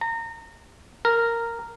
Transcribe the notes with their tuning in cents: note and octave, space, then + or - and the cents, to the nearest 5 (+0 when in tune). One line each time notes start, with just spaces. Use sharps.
A#5 -30
A#4 -10